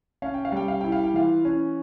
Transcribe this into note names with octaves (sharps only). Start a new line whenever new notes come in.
C#4 F5
G5
F5
G3 G5
F5
E4 G5
F5
G5
E3 F4 F5
C#4